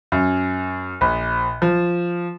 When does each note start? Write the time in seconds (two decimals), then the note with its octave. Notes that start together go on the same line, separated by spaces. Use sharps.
0.12 F#2
1.01 A#1
1.62 F3